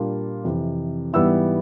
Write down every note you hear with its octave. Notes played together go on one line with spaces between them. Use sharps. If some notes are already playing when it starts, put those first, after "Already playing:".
Already playing: A#2 G3 A#3 D4 F4
F2 C3 E3
G#2 E3 G3 B3 E4 E6